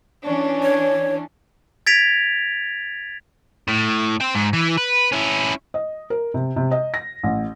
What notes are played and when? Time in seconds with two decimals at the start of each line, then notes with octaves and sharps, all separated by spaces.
0.24 E3 C#4 D4
0.63 C#5
1.87 G#6 A6 B6 D7 F7
3.68 A2
4.20 C5 G5
4.35 G#2
4.53 E3
4.77 B4
5.12 C#4 E4
5.74 D#5
6.10 A#4
6.34 C3
6.56 C3
6.71 D#5
6.94 A#6
7.24 A1